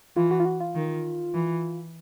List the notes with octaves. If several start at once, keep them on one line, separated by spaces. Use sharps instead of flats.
E3 F4
F#4
F4
F#4
F4
D#3
E3